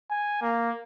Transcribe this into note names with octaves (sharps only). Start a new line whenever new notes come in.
G#5
A#3